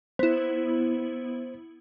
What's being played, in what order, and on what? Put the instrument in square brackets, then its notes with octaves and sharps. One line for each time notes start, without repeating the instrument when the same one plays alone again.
[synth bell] B3 E4 [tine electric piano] C5